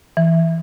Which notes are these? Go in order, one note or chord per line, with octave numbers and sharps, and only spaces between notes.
E3